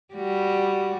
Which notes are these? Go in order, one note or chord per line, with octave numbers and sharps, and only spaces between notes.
G3 F#4